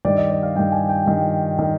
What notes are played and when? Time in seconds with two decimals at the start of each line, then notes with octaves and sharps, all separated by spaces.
0.05 G2 D#3 D5
0.17 D#5
0.30 D5
0.43 F5
0.55 G2 D#3 G5
0.72 G#5
0.89 G5
1.06 G2 D#3
1.59 D#3